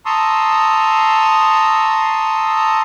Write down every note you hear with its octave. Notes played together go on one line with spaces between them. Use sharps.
A5 A#5 C6 C#6 D#6 E6